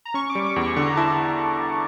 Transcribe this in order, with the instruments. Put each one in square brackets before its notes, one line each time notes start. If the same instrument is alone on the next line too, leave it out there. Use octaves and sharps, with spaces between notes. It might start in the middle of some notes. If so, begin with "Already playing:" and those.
[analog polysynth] A#5
[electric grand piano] C#4 [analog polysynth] C#6
[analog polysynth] D6
[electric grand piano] G3
[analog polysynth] D6
[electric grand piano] E2 [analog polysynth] C#6
[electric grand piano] D3 [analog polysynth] C#6
[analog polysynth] A#5
[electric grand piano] E4 [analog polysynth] A5